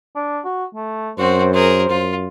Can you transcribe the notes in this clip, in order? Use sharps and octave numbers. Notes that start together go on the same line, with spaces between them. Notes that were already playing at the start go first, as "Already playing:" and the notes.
D4
F#4
A3
F#2 C4 F#4 C5
G#4 A#4 C5
F#2 F4